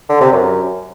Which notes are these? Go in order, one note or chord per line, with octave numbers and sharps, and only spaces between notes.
D3
C3
F#2